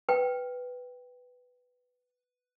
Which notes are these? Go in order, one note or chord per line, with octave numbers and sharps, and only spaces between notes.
B4 G5